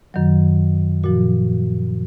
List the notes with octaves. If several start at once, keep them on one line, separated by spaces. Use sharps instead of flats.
F#2 D#3 F#3
A#2 F3 F#4